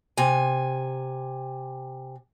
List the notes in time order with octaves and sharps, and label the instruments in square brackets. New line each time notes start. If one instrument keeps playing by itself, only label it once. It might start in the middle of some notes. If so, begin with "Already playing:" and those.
[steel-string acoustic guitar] C3 G#5